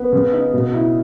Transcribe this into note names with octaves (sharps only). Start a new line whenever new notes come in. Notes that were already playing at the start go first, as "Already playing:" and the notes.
Already playing: B3
C#3
D#4
B2
E4